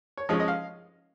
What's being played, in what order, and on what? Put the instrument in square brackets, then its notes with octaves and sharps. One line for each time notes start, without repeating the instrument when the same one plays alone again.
[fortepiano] C#5
F3 G#3 C#4 D#5
D#5
F5